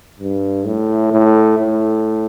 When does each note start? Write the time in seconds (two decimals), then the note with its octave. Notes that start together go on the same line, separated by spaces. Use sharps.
0.19 G2
0.66 A2
1.11 A2
1.58 A2